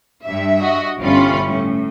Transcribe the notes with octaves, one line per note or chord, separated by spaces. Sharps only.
G2 E5
F#4 D#5
G1 E3 G3 C#4 F4 B5
A2